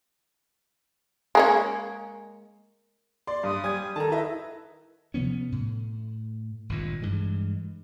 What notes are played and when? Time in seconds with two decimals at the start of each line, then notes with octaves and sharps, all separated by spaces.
1.35 G#3 A#3 C#4
3.27 D5 C6
3.43 G2 D#6
3.64 G3 G#5 G#6
3.96 D#3 A4 A5 A#5
4.12 E4 B4 D#5 E5
5.14 C3 F3 B3 C#4
5.52 A2
6.69 G#1 G2 A#2
7.02 G2 E3 G#3